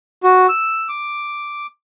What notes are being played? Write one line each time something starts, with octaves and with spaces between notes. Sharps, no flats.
F#4
E6
D6